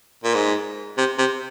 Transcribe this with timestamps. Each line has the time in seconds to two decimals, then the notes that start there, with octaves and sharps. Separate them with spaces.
0.24 A#2
0.34 G#2
0.98 C3
1.18 C3